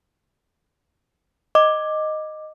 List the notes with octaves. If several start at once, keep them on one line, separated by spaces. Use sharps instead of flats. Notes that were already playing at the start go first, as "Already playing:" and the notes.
D#5 D6